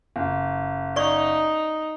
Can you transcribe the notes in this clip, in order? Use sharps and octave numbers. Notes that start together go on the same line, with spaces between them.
F#1
D#4 D5 C#6